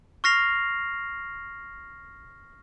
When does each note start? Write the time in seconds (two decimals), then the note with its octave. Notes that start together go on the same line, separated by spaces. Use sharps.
0.24 C#6 F6 A#6 C7 F7